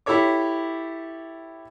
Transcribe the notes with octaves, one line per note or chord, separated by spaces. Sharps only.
E4 G4 A4 C#5 D6